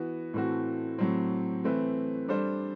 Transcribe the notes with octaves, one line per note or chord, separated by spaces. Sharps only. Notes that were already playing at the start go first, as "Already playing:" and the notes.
Already playing: E3 B3 F#4 B4
A2 E3 A3 C4 F#4
A2 F#3 C4
E3 A3 C4 E4 B4
G3 D4 A4 C5